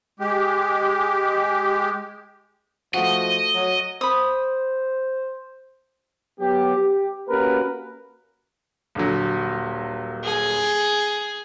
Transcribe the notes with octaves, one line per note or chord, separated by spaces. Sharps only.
G#3 G4
F3 A3 F#4 D#5
F#3
C5 B5 D#6
F#3 B3 G4
G4
A#3 C#4 F#4 G4 A#4 B4
D#1 D3 F#3
G#4